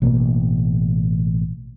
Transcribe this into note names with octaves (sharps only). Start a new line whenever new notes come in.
A1 B2 A#3 B3